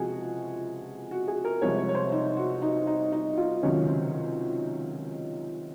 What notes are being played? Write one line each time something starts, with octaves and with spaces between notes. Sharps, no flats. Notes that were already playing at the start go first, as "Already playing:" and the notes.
Already playing: C#2 C3 F3 G#3 F#4 G#4
F#4
G#4
A#4
C2 C3 F3 G#3 C#5
C#5
C#5
C5
D#4
F#4
D#4
D#4
D#4
F4
C#2 C3 D#3 F#3 C#4
C4